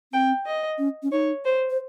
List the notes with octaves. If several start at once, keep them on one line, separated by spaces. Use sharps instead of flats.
C4 G5
D#5
C#4
C#4
D#4 C#5
C5
C5